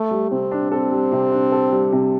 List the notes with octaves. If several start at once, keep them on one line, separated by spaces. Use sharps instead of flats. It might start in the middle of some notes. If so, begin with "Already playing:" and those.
Already playing: A3 A4
G3
C3 C4
D4
C4 A4
G3
C3
D4
A4
G3
C3